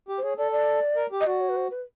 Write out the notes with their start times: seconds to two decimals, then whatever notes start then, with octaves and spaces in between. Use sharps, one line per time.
0.08 G4
0.18 C5
0.23 G#4 C#5
0.38 A4 D5
0.52 D5
0.96 A#4
1.12 G4
1.21 D#5
1.26 F#4 D5
1.41 C#5
1.49 B4
1.56 C5
1.71 B4